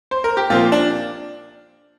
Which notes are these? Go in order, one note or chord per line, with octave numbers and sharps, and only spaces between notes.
C5
A#4
G4
A#2 F3 A#3 C4 F4
D4